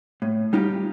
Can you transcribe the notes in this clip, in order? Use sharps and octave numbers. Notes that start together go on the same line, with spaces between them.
A2
G3 D#4 F4 G4